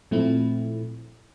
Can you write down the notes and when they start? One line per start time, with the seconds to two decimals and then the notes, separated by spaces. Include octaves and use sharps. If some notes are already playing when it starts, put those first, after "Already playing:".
0.11 A#2 F3 A3 C4 E4